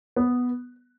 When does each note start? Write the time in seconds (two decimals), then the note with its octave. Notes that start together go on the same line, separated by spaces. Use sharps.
0.16 B3